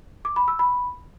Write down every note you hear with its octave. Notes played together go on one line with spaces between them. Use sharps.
D6
B5
E6
B5